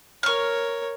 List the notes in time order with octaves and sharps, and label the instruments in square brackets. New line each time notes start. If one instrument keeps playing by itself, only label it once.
[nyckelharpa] A#4 C#5 [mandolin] C#6 F6